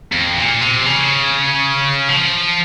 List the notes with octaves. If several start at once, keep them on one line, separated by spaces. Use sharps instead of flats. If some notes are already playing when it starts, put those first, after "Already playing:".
F2
A#2
C3
C#3
F3